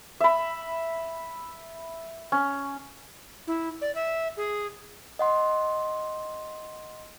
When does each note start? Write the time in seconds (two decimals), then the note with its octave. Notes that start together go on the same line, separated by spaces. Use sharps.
0.20 E5 B5
2.32 C#4
3.47 E4
3.81 D5
3.95 E5
4.37 G#4
5.19 D#5 F#5 C6